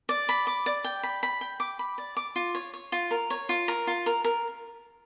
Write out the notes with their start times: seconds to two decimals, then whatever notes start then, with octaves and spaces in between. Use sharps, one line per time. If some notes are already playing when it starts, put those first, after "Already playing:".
0.09 D5
0.29 B5
0.47 D6
0.66 D5
0.84 G5
1.03 B5
1.23 B5
1.41 G5
1.60 D6
1.79 B5
1.98 D5
2.17 D6
2.36 F4
2.55 C#5
2.74 C#5
2.92 F4
3.11 A#4
3.30 C#5
3.49 F4
3.68 A#4
3.87 F4
4.06 A#4
4.24 A#4